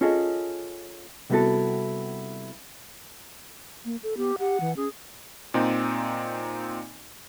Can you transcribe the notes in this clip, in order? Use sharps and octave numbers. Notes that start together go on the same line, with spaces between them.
C#4 F4 G#4 A4 D#5
C3 G3 B3 E4 F#4 A4
A#3
A4
B3 G4
G4 F#5
E3
C#4 G#4
A#2 C4 D#4